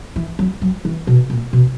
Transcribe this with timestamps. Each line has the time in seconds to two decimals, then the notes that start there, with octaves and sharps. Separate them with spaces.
0.16 E3
0.39 F#3
0.62 F#3
0.85 E3
1.07 B2
1.30 A#2
1.53 B2